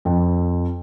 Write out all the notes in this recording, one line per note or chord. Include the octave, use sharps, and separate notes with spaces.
F2